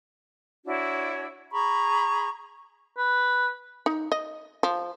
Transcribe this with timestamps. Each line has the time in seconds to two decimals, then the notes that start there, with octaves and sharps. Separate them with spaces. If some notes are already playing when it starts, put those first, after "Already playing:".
0.65 D4 E4 F#4 C#5
1.51 G#4 A#5 B5 C#6
2.98 B4
3.86 D#4
4.12 D#5
4.63 F3